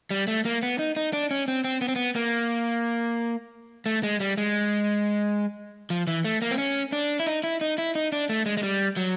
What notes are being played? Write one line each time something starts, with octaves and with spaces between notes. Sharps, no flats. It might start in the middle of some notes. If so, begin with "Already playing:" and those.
G3
A3
A#3
B3
D#4
D#4
D4
C#4
C4
C4
B3
C4
B3
A#3
A3
G#3
G3
G#3
F3
E3
A3
A#3
C4
C#4
D4
E4
D#4
E4
D#4
E4
D#4
D4
A3
G#3
G#3
G3
F#3